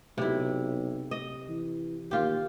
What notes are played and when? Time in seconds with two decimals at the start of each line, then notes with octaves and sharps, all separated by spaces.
0.18 B1 C3 E4
1.11 D#5
1.49 E3
2.11 D#2 F4 G4